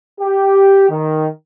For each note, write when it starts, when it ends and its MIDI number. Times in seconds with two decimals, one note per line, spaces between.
0.20 0.86 67
0.89 1.27 51